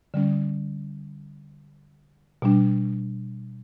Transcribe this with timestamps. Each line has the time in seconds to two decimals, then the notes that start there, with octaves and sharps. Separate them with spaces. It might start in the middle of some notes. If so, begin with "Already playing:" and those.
0.14 D3 G3 C#4
2.42 B2 G3 D4